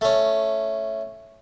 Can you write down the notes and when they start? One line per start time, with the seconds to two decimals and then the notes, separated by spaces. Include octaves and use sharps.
0.01 A3 C#4